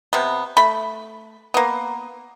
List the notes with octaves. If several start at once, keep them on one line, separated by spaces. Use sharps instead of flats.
C3 B3
A3 B5
A#3 B3